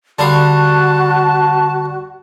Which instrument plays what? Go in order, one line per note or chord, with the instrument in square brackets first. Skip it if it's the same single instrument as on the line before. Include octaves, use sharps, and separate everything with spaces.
[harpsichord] D3 G3 F5 [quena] F#4 [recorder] A5